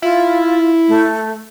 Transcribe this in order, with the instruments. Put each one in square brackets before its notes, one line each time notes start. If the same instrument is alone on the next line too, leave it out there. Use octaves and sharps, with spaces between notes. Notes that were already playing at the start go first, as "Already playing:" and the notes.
[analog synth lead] E4 [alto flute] F4
[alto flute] A3